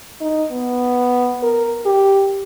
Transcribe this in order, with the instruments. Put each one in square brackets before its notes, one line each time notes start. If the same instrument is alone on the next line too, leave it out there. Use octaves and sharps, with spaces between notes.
[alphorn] D#4
B3
A#4
G4